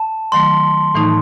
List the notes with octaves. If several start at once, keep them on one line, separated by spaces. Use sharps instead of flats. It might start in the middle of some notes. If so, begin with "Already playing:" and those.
Already playing: A5
D#3 F#3 A3 C6
A2 E3 A3 D#4